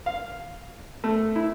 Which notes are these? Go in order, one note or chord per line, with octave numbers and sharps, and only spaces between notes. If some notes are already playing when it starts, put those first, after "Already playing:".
F5
A3
E4